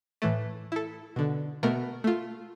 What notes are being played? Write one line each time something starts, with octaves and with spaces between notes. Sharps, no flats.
A2 E3 A3
E4 A4
B2 D3
B2 A3 B3 A#4
A3 F4